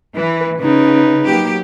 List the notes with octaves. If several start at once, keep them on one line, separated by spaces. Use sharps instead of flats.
E3 B4
C#3 D#4 B4
F#3 A#3 G4